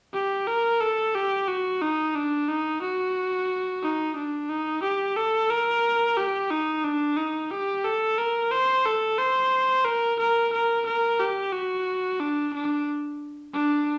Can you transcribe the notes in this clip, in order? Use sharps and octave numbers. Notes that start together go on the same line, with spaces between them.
G4
A#4
A4
G4
F#4
D#4
D4
D#4
F#4
D#4
D4
D#4
G4
A4
A#4
G4
D#4
D4
D#4
G4
A4
A#4
C5
A4
C5
A#4
A#4
A#4
A#4
G4
F#4
D4
D4
D4